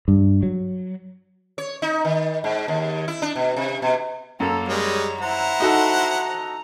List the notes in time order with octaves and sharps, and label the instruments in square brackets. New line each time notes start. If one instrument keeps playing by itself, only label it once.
[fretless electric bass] G2
F#3
[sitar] C#5
D#4
D#3
G#2
D#2
E4
D4
B2
C3
B2
[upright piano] F#2 [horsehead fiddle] A#3 A4
[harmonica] G3 G#3 [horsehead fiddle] C#5
[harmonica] E4 C5 F#5 [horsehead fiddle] A#5
[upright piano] D#4 F#4 A4